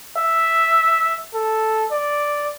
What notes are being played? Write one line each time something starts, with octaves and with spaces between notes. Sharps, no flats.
E5
A4
D5